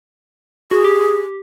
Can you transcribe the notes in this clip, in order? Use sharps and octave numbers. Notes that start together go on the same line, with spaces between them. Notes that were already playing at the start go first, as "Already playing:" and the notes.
F#4 G#4
G4